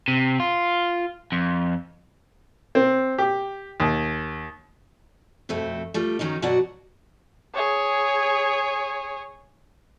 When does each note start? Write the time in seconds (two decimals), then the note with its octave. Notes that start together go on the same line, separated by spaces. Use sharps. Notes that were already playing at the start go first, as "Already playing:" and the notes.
0.08 C3
0.40 F4
1.32 F2
2.75 C4
3.18 G4
3.80 D#2
5.49 F2 B2 A3 C4
5.94 G3 A3 F4
6.19 D#3 F#3 C#4 D#4
6.42 B2 F#3 F#4 D5 F#5
7.54 G#4 C#5